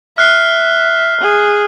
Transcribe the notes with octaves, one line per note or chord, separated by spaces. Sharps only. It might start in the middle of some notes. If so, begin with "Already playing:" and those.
E5 F6 F#6 C7
G#4